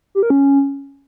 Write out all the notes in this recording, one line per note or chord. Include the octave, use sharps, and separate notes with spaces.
G4
A#4
C#4